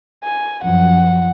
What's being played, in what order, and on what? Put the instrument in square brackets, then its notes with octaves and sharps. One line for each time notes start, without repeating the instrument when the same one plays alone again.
[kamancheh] G#5
[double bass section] F#2 F3 [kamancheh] F#5